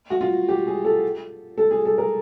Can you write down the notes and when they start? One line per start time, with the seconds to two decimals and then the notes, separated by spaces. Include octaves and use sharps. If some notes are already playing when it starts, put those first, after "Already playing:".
0.10 F#4
0.21 F4
0.49 G4
0.67 G#4
0.85 A4
1.58 A4
1.71 G#4
1.85 A4
1.98 A#4